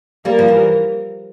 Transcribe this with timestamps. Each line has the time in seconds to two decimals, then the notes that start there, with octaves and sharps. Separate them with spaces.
0.25 G3 A#3 A#4
0.39 F3
0.48 E3